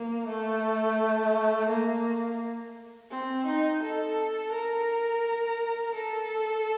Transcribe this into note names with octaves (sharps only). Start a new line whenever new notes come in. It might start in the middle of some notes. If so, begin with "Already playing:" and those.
Already playing: A#3
A3
A#3
C4
D#4
A4
A#4
A4